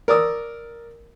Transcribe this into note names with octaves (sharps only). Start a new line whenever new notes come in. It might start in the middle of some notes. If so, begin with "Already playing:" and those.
A#4 D5 D#6 E6